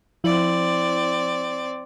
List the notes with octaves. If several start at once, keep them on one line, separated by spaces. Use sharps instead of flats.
F3 C4 E4 D5 F#7